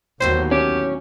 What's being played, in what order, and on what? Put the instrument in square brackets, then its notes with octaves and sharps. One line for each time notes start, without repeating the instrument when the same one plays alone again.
[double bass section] D#2 B3 [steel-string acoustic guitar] A2 D3 F#3 [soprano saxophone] C5
[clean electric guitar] C#4 [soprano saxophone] G4